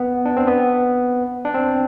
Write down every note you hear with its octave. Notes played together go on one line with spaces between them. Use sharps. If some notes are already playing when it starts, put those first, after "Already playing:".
Already playing: B3
D4
C4
B3
D4
C4